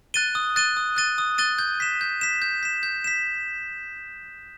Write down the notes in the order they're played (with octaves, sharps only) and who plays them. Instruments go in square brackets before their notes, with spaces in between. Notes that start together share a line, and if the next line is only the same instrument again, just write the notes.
[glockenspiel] F#6 A6 D#7 G7
D#6
F#6 A6 D#7 G7
D#6
F#6 A6 D#7 G7
D#6
F#6 A6 D#7 G7
G6
B6 E7
G6
B6 E7
G6
B6 E7
G6
B6 E7